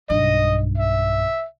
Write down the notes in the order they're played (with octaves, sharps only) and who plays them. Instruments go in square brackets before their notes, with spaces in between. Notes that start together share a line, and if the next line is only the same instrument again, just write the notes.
[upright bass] B1 G2 [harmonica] D#5
[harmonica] E5